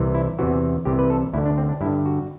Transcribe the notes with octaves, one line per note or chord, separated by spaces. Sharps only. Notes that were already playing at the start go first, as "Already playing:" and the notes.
Already playing: C2 C3 E3
E4
E2 C3 E3 F#4
C2 C3 E3 G4
B4
A4
D2 D3 E4
D4
C4
D4
G2 E4
D3
F#4